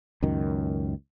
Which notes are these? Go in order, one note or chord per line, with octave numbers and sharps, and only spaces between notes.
C#2 F#2 D#3